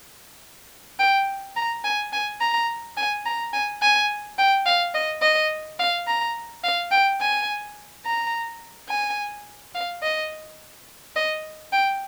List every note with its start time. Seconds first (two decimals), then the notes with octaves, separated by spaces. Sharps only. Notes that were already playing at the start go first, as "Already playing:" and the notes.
0.99 G5
1.56 A#5
1.84 G#5
2.13 G#5
2.41 A#5
2.97 G#5
3.26 A#5
3.53 G#5
3.82 G#5
4.38 G5
4.66 F5
4.95 D#5
5.22 D#5
5.79 F5
6.07 A#5
6.64 F5
6.92 G5
7.21 G#5
8.06 A#5
8.89 G#5
9.75 F5
10.03 D#5
11.16 D#5
11.73 G5